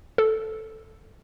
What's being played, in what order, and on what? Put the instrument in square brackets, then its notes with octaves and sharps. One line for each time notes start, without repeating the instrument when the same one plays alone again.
[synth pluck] A4